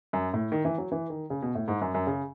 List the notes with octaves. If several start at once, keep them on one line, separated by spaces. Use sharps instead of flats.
F#2
A2
D#3
E3
F#3
E3
D#3
C#3
B2
A2
G#2
F#2
F#2
C#3